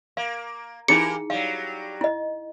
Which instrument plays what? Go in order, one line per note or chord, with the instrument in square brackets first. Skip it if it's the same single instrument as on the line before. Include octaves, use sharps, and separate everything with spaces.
[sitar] A#3 [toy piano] F5
[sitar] E3 A#3 G4 [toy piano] D#4 E4 G#4 [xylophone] C#7
[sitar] F#3 G3 [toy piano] F5
[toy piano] E4 D#5